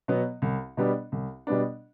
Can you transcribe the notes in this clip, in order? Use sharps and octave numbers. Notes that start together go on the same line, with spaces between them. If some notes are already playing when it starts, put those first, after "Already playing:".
B2 F#3 B3
C2
B2 G3 B3 D4
C2
B2 G3 B3 D4